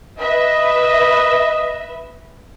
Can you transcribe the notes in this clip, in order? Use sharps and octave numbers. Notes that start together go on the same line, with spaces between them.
B4 D#5 E5